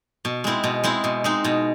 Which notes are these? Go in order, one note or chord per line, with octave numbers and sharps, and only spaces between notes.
B2
G#3 C4 E4
B2
G#3 C4 E4
B2
G#3 C4 D#4
B2